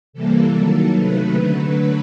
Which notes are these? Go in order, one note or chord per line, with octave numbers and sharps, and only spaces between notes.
C3 E3 G3 A#3 A4
D#3 F#3 A#3 A4
C3 D#3 F#3 A3 B4
D3 F#3 A3